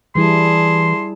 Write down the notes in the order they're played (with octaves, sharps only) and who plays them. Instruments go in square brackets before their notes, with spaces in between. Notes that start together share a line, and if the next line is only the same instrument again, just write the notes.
[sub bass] E3 [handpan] G3 E4 [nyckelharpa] G#4 A5 [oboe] C6